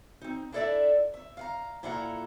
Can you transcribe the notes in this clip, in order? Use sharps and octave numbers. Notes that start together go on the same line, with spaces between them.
C4 D#4
D4 E4 A4 C#5 D5 E5
E5
F5 F#5 A#5
A#2 E4 F4 A4 F#5 A#5